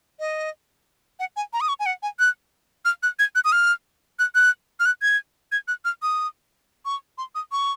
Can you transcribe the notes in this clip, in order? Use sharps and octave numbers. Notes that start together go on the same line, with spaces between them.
D#5
F#5
G#5
A#5
D#6
C#6
G#5
F#5
G#5
F#6
F6
F#6
G#6
F#6
D#6
F6
F#6
F#6
F6
F#6
G#6
G#6
F#6
F6
D#6
C#6
C6
D#6
C#6